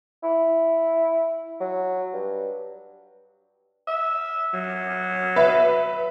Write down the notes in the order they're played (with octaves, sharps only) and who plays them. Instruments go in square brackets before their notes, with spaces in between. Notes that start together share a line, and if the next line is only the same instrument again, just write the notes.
[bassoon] E4
F#3
G2
[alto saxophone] E5
F#3
[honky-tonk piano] B4 E5